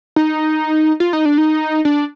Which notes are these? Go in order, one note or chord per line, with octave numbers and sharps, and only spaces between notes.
D#4
F4
D#4
D4
D#4
D4